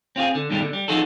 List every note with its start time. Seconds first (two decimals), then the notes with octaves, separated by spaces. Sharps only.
0.16 C4 F4 F#4 G#4
0.35 D3
0.50 G2 B2 D#3 G3 G#3
0.61 D3
0.73 G3
0.88 E3 F3 D#4 F#4 G#4 A4